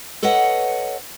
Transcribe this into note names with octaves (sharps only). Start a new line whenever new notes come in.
A4 B4 C#5 D#5 F#5